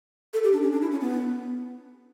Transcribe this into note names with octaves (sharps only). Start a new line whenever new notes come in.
A4
G4
D4
C#4
D4
E4
C#4
B3